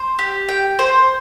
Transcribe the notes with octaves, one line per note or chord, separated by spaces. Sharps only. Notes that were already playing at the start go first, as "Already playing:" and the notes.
Already playing: C5
G4
G5
C5